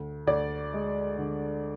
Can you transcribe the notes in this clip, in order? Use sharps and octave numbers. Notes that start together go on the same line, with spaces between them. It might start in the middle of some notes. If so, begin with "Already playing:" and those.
Already playing: D2
D2 D5
G#3
D3